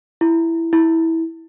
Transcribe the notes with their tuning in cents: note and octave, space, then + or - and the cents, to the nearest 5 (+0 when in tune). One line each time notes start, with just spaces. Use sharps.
E4 +5
E4 -15